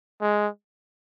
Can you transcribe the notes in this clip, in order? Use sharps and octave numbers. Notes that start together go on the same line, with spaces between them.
G#3